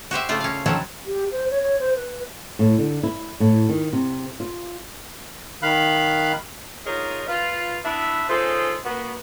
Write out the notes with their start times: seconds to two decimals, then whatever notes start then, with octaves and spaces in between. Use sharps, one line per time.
0.11 F#4 G4 C5 E5
0.29 C#3 A3 F4 D5
0.40 C#4 F5
0.66 B2 D#3 F3 F#3 C#4 A4
1.07 G4
1.32 C5
1.51 C#5
1.63 C#5
1.80 C5
1.96 B4
2.59 A2
2.78 D3
3.03 E4
3.40 A2
3.69 D#3
3.93 C3
4.40 F4
5.62 D#3 F5 B5 F#6
6.86 D#4 F4 G#4 A#4 C#5 D#5
7.28 F4 B4 F5
7.84 B3 D4 E4 E5
8.29 C#4 D#4 F4 G#4 A4 C5
8.85 A#3 B3 F#4